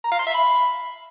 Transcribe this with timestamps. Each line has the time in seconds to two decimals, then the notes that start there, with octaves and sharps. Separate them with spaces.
0.04 A#5
0.12 F5
0.19 C6
0.27 E5
0.34 B5